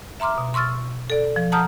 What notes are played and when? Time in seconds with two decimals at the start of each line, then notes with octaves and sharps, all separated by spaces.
0.20 E5 A#5 C6 D6 F6
0.38 B2
0.54 C6 C#6 E6 F6 A6
1.10 A4 D5
1.36 F3
1.52 F#5 A5 A#5 D#6 F6 G6